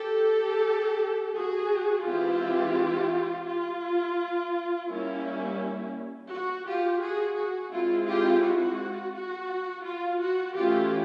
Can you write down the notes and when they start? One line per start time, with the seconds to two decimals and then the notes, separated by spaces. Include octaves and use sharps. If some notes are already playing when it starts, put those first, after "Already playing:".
Already playing: G4 A4
1.34 F#4 G#4
2.06 E3 G#3 C4 E4 F4 G4
3.48 F4
4.90 G3 A#3 C#4 E4
6.31 F#4
6.66 F4 G4
7.02 F#4 G#4
7.37 F#4
7.73 G#3 C4 E4 F4
8.08 F4 G4
8.44 F#4
9.15 F#4
9.86 F4
10.22 F#4
10.56 E3 A3 C#4 E4 F4 G4